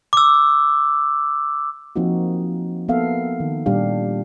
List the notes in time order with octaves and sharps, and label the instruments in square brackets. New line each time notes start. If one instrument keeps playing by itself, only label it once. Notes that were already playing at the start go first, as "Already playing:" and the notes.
[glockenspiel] D6 E6
[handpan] F3 A#3 C4 D#4 F#4
A#3 B3 A4 E5 F5
D#3
A#2 G3 D4 G4 F5